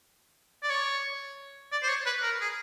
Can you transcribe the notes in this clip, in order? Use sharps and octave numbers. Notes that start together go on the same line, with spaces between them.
D5
C#5
D5
C5
C#5
B4
A#4
G#4